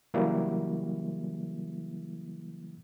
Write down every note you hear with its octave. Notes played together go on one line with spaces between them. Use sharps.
C#3 E3 F#3 G3 A#3 E4